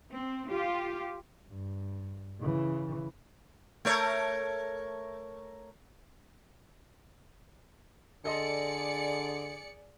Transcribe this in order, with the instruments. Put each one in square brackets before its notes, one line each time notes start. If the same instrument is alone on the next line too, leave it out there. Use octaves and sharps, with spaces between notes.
[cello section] C4
F4 G4
[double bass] G2
C#3 E3
[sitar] A3 A#4 C#5
[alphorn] D3 [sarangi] G#4 [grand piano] A4 D#5 C6 [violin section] D5 C#7